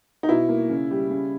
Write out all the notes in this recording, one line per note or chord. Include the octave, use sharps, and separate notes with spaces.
D#4
B2 E4
A#3
C#3
G3
C#3